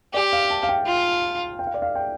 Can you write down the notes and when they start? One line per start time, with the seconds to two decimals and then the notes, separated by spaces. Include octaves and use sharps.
0.14 G4 D5
0.33 F5
0.50 A5
0.63 F5
0.69 G5
0.87 F4
1.59 G5
1.67 F5
1.74 D5
1.82 F5
1.95 G5